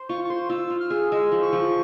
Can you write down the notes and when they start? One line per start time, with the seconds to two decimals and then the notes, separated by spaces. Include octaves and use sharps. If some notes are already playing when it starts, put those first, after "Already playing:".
Already playing: C5
0.09 F4 C#6
0.24 C#6
0.29 C5 C6
0.49 F4 E6
0.70 F4
0.81 F6
0.90 G#4
1.11 G#3 E6
1.32 F3
1.42 C#6
1.53 F3